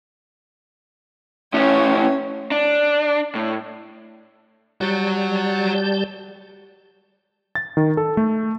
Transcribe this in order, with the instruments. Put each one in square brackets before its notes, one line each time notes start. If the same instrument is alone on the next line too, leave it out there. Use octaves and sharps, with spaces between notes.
[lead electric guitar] A2 C#4 [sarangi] C#5
[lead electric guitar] D4
A2
[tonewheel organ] G3 A5 G6 [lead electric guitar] F#4 C#5
[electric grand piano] A6
D#3
A4
A3